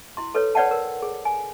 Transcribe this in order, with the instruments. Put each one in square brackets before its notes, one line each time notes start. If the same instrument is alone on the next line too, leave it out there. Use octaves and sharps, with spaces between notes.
[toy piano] E4 C6
A4 B4 C#5
B4 C#5 D5 F#5 G5 A5
A#4
G#4
G#5